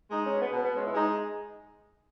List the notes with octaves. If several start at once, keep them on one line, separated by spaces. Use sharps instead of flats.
G#3 D#4
C#4
B2
B3
B2 B3
B3
G#3 C#4
E4
G#3 D#4